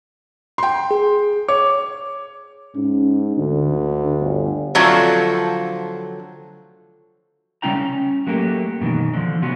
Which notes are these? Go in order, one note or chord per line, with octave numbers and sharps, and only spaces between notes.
G5 C6
G#4
C#5 D6
G#2 C#4
D2 D3
D3
G1
D3 F3 F#3 A3 C4 F4
C#3 G3 C#4 E4 G5 A#5
C#4
F#3 A3 A#3 F4 G4
F#2 B2 D#3 E3
D3 F3
C3 F3 F#3 B3 F#4